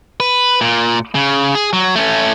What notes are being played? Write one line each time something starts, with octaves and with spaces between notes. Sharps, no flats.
B4
A#2
C#3
G#4
F#3
A3 C#4